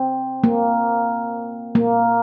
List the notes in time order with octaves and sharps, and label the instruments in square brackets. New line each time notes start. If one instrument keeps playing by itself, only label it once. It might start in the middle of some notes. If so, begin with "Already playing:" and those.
Already playing: [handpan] C4
A#3
A#3